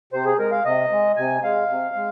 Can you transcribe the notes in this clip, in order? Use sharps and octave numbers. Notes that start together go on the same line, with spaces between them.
C3 C5
G#4
G#3 A#4
F5
C3 D#5
G#3
C3 G#5
G#3 F5
C3
G#3